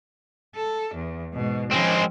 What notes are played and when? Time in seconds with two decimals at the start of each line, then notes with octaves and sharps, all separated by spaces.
0.55 A4
0.95 E2
1.33 G#2 B2
1.72 F3 G#3 C4 C#4